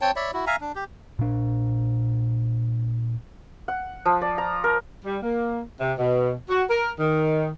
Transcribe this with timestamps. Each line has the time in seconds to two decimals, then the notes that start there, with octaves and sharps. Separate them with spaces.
0.01 C4 C#5 G5 A5
0.16 C#5 D5 E5 B5
0.33 E4 F#4
0.47 E5 F5 G#5 A#5
0.61 D4
0.75 G4
1.19 A#2 D4
3.68 F#5
4.05 F3
4.21 D5
4.38 A#5
4.64 A#4
5.04 G3
5.22 A#3
5.80 C3
5.98 B2
6.49 F#4
6.69 A#4
6.99 D#3